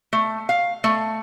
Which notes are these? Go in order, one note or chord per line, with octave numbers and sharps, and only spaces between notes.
A3
F5
A3